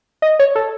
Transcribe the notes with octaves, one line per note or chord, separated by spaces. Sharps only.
D#5
C#5
A4